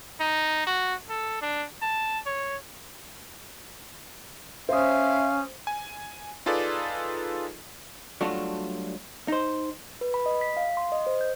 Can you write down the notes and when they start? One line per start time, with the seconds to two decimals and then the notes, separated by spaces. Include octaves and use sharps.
0.20 D#4
0.66 F#4
1.10 A4
1.42 D4
1.82 A5
2.26 C#5
4.69 C#4 C5 E5 F5 D#6
5.67 G#5
6.46 D#4 F4 G#4 A4 B4 D5
8.21 F#3 G3 A3 D4 F4 F#4
9.28 D#4 C5
10.01 B4
10.14 B5
10.26 D#5
10.41 B6
10.57 F5
10.77 C6
10.92 D#5
11.06 C5
11.21 G6